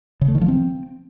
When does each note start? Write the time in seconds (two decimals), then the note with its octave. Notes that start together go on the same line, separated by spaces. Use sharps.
0.21 C#3
0.28 A3
0.35 D#3
0.41 F3
0.48 C4